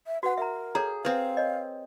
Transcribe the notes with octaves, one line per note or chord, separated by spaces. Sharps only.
E5
F#4 B4 F#5
A#4 E5 A#5
G#4 A4 C#5 A#5
C4 G#4 B4 F5
C#5 D#5